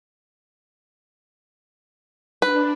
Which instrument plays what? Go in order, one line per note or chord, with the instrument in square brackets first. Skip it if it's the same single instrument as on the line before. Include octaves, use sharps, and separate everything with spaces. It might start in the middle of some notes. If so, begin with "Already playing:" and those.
[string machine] D4 [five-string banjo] B4